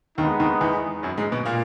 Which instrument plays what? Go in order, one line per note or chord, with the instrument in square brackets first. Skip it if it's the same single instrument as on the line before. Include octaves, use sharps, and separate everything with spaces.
[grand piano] D#2 D#3 [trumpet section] G#3 B3 D#4
[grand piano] D#2 D#3
E2 E3
F#2 F#3
G#2 G#3
B2 B3
A#2 A#3